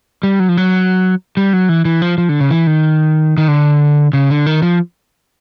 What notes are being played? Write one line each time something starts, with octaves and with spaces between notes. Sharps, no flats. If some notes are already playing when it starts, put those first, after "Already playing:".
G3
F#3
F3
F#3
G3
F#3
E3
E3
F3
F3
D3
C#3
E3
D#3
D#3
D3
C#3
D3
D#3
F3